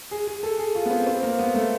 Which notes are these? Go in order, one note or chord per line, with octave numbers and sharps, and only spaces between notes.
G#4
G#4
A4
G#4
F4
B3
C4
C4
A#3
B3
A3